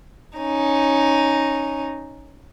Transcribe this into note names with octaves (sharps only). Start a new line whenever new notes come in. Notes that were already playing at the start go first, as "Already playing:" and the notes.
C#4 D#4